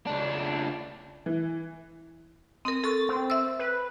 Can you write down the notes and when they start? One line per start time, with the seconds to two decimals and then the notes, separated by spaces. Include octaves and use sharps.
0.07 C#2 D4
1.26 E3
2.65 C4 A#4 D#6
2.84 A4 C#6 A6
3.09 C4
3.30 E5 E6
3.59 B4